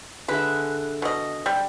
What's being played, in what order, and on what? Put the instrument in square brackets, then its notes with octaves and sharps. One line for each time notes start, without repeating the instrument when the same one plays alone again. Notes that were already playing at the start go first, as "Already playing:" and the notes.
[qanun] D3 G#3 E5 [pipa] B4
[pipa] B2 D#5
G3